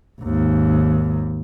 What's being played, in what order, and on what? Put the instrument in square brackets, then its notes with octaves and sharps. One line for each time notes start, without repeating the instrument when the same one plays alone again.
[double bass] G#1 D#2